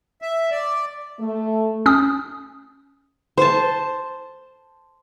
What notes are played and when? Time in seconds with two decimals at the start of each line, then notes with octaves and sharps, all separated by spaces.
0.22 E5
0.51 D5
1.20 A3
1.86 C#4 D#6
3.38 C5 A5